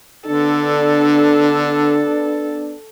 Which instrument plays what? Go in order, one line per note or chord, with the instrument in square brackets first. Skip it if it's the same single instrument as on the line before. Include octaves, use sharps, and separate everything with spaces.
[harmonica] D3 [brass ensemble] B3 D4 [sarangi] A4